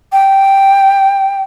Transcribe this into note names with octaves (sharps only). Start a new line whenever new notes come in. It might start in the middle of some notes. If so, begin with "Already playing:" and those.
G5